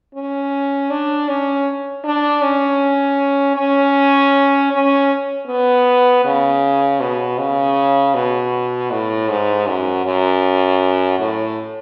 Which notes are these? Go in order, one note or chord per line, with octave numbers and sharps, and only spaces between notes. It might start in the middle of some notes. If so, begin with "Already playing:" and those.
C#4
D4
C#4
D4
C#4
C#4
C#4
B3
C#3
B2
C#3
B2
A2
G#2
F#2
F#2
A2